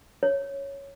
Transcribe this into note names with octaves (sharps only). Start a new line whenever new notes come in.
C#5